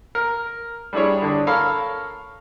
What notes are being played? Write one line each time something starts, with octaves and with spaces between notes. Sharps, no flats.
A#4
G3 D4 E4 G#4 C#5
D3 D4 D#6
A4 A#4 C#5 F5 B5